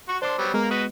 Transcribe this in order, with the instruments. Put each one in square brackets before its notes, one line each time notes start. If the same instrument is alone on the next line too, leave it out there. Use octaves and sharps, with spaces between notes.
[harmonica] F#4 C#6
[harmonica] D4 C6 [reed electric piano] C5 D6
[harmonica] F#3 G3 B3
[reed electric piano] G#3 B3 [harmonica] A#3 A#4
[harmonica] F#4 B4 D#5